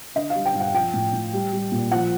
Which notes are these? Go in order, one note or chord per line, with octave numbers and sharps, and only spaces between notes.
D3 D#5
F5
G3
G5
G2
F#5
F3 G5
A2
A2
G3
G3
A#2
F3 F#5